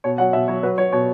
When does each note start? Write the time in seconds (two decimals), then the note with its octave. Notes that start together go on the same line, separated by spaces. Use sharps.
0.04 B2 C#5
0.18 F#3 F#5
0.33 B2 E5
0.48 F#3 C#5
0.63 F#3 B4
0.78 F#3 C#5
0.92 B2 C#5